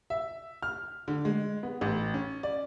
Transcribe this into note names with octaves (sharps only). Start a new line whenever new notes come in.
E5
F6
D3
G#3
B3
A1
C#4
D5